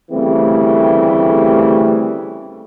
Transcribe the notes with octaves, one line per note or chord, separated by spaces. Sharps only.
D2 C#3 E3 G3 A3 C4